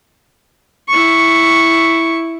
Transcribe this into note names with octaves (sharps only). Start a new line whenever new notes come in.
E4 C#6